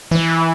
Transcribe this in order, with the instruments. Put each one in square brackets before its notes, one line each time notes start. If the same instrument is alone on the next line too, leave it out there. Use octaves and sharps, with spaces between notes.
[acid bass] E3